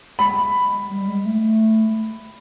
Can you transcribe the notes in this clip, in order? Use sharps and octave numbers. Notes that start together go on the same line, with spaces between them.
G#3 B5
G3
G#3
A3